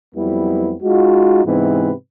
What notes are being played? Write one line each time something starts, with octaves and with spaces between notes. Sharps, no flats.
F2 F#3 G3 B3 C4 E4
G#3 D#4 F4 F#4
G#2 C3 E3 B3 C4 B4